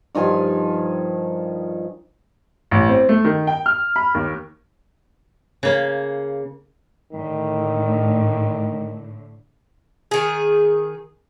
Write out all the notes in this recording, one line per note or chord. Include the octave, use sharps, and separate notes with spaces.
G2 D#3 F3 G#5
A1
C4
A3
D#3
G5
F6
B5
D#2
C#3 A#3
A2 D3 D#3
D#3 G#4